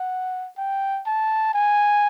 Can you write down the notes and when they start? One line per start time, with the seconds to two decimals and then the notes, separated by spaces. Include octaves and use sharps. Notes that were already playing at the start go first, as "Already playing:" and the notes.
Already playing: F#5
0.58 G5
1.06 A5
1.54 G#5